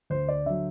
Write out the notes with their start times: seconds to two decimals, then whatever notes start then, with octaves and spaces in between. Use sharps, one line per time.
0.10 D2 C5
0.28 D5
0.46 D3 F#3 E5